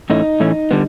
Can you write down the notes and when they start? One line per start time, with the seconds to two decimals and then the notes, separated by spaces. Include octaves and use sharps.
0.10 A2 E3 A3 C#4 D#4
0.40 A2 E3 A3 C#4
0.71 D3 G3 B3